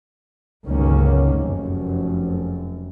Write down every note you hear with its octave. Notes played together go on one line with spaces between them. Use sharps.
G1 C#2 D#3 F#3 A#3 C#4
F1 F#2